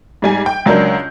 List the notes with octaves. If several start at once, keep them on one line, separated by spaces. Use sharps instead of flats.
G#2 G3 G#5
G5
C#2 F#3 D4 A#4 G6